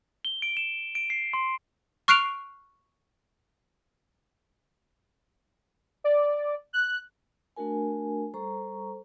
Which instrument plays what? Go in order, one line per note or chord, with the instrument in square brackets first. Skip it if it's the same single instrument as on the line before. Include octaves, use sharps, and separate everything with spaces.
[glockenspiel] G7
D7
E7
D7
C7
C6
[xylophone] C#6 F6 F#6 C7 D7 F7
[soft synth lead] D5
F#6
[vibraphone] A3 D4 F#4 A#4 G#5
G3 A4 C5 A#5 C#6